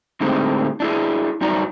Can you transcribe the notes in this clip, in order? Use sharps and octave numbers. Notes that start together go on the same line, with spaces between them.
A2 D3 G#3 C4 D#4 G4
D4 E4 G#4
G2 F#3 D#4 D5 A#5